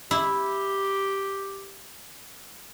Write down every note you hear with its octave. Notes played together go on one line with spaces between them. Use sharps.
E4 G4